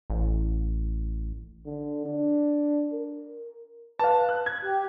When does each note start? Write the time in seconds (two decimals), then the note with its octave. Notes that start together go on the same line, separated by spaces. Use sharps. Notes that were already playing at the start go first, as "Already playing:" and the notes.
0.10 A1
1.66 D3
2.06 D4
2.93 A#4
3.99 B4 F5 A5
4.29 F#6
4.46 G#6
4.63 G4